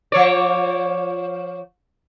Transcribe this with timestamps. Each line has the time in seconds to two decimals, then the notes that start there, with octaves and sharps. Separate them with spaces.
0.12 F3 C#5 D5